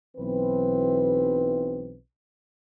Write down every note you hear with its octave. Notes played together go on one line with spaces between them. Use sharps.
B1 E3 C4 B4